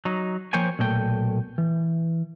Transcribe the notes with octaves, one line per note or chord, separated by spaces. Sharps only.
F#3 D#4
F3 A#3 C5 C#5 G5 G#5
B1 A#2 A3 G5
E3